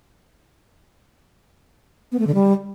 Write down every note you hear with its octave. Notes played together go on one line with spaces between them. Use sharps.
B3
A3
D3
G3